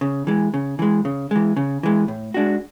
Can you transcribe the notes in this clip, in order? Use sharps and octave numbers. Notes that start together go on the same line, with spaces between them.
C#3
E3 G#3
C#3
E3 G#3
C#3
E3 G#3
C#3
E3 G#3
A2
G#3 D4 F#4